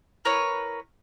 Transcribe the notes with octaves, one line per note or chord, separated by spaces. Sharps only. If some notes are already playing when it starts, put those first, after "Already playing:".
E4 A#4 B4 C#5